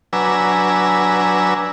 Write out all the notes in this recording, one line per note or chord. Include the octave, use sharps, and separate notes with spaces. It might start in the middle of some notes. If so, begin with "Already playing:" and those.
F#3 D4 B4 G#5 A#5 E6